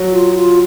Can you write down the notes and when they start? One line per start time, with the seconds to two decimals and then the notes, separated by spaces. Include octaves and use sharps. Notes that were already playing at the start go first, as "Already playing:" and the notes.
Already playing: F#3
0.12 F4
0.35 F4